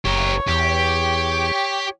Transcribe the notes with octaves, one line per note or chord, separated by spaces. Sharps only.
F#1 G4 A#4 C#5
E2 G4